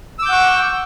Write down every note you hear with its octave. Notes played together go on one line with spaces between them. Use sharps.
F#5 C#6 D6 E6 G6